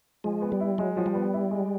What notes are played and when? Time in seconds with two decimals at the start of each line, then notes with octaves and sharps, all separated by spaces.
0.24 F3 G#3
0.42 B3
0.52 G3
0.60 E4
0.78 F#3 G#3
0.97 F3
1.06 G3
1.15 B3
1.34 E4
1.51 G#3